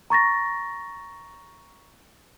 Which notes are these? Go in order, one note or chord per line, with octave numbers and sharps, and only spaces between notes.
A#5 C#6 A6 A#6